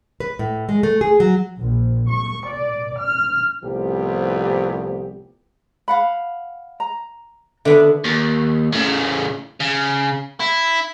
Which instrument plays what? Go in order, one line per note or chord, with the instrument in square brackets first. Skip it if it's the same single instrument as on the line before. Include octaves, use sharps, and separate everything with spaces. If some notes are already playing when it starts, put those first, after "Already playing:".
[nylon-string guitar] B4
A2
G#3
A3
G#4
F#3
[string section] A#1
C#6
D5
F6
[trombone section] C2 A2 F3 B3 G4
[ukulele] F5 F#5 B5
A#5
[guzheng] D3 B3 D4 [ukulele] E5
[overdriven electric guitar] D#2
A2 C#3
C#3
E4